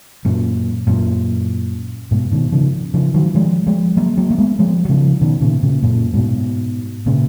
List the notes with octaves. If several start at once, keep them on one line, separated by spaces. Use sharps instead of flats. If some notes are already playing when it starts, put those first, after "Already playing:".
F#2 A#2
F#2 A#2
G#2 B2
B2 D#3
C#3 F3
C#3 F3
D#3 F#3
F3 G#3
F3 G#3
F#3 A#3
F#3 A#3
A#3
G#3 B3
F3 G#3
F#3
C#3 F3
B2 D#3
A#2 C#3
A#2 C#3
F#2 A#2
G#2 B2
A#2 C#3